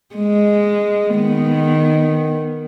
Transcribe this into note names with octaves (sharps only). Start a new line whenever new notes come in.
G#3
D#3 B3